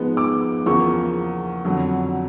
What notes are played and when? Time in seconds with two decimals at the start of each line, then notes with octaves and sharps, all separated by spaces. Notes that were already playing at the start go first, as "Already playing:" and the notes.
Already playing: G#2 F3 G#3 B3
0.17 D6
0.66 E2 C#3 F3 A#3 C#6
1.65 F2 D3 F#3